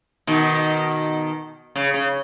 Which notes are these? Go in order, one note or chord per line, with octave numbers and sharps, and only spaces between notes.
B2 D#3
C#3
C#3